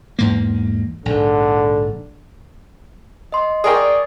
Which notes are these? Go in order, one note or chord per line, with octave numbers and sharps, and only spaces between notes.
E2 G#2 A#3
A#1 G#2 D3
D#5 C6
G#4 A#4 D5 G5 C#6 D#6